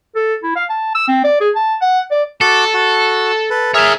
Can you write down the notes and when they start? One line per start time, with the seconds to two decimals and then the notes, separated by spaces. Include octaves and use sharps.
0.15 A4
0.44 E4
0.56 F5
0.70 A5
0.95 E6
1.08 C4
1.24 D5
1.40 G#4
1.56 A5
1.81 F#5
2.11 D5
2.41 F#4 A4 A5 D6
2.74 F#4
3.50 A4 B4
3.74 G#4 A#4 C#5 E5 A5